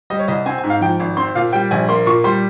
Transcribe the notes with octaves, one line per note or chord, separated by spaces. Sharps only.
G3 D#5
C#5
C2 D#5
C4 G#5
G#5
G#2
F5
F3 G5
G#1
C4 C6
A#2 F5
G3 G5
A#1 G#5
A#3 C6
A#2 C#6
G3 C6